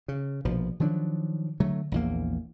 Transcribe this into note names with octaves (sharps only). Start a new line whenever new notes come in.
C#3
A#1 B2 F3
D#3 F3 F#3 D4
D3 F#3 A3
A#1 E2 A#3